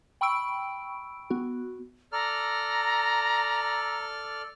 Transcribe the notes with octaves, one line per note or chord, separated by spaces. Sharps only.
G5 B5 C#6 E6 D7
B3 F#4
A4 D5 A#5 F6